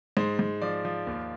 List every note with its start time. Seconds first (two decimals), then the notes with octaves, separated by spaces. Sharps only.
0.17 G#2 C5
0.39 G#2
0.62 F3 D5
0.85 F3
1.07 D#2